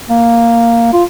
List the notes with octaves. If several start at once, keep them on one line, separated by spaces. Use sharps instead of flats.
A#3
F4